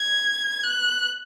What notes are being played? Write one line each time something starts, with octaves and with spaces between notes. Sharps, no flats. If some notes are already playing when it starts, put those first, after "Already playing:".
Already playing: G#6
F#6